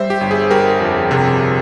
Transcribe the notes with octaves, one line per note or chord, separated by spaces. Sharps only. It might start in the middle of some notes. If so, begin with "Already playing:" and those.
Already playing: G3 C5 E5
G4
G1
G#4
G1 G4 A#4
F2
C3